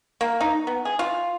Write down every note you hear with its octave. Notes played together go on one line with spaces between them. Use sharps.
A#3
D#4
B3
G#4
F4